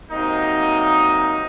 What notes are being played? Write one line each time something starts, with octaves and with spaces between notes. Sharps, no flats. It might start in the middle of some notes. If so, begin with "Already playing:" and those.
C3 F#3 A#3 D#4